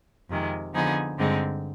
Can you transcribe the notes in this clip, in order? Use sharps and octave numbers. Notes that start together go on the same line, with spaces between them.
F2 C3 D#3 G#3
D3 F3 B3 D#4 G#4
G2 D3 G#3 C4 D#4